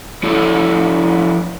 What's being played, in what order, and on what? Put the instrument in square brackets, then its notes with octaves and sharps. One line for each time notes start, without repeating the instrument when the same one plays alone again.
[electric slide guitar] F3 E4 A4 C#5